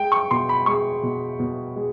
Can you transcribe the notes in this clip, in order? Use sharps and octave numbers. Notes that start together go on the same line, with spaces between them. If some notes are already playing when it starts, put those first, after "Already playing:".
Already playing: G#3 G5
C#6
B2 C6
B5
G#3 C#6
B2
B2
G#3